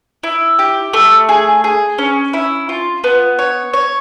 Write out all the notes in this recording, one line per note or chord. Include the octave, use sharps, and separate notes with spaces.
E4
G4
A3
G#4
G#4
C#4
E4
F4
B3
C#5
C#5